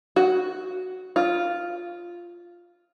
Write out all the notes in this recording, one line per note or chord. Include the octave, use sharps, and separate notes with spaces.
F#4
F4